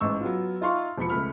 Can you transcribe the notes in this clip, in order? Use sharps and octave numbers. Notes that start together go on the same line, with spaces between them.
A1 G#2 C#6 E6
F#3 B3 F4
D#4 F4 E5 F5 C6 C#6
E1 F3 B5 C#7
C#2 A3 B5 F6